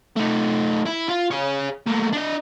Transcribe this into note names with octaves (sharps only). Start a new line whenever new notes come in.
A3 D#4
E4
F4
G#4 C#5
A3 A#3
D4 D#5